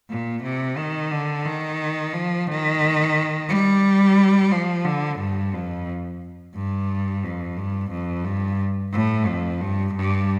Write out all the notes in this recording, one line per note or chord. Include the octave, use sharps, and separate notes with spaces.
A#2
C3
D#3
D3
D#3
F3
D#3
G3
F3
D3
G2
F2
G2
F2
G2
F2
G2
A2
F2
G2
G2